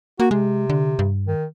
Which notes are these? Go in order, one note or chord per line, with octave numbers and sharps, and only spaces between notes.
A#3 F#4
C3 G#3
D3
G2
D#3